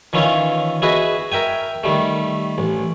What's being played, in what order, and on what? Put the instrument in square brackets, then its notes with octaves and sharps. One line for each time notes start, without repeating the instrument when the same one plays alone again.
[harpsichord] D#3 E3 C#4 E4 F4
E4 F#4 G#4 B4 D#5
A#4 E5 G5 G#5
D#3 G3 A3
A1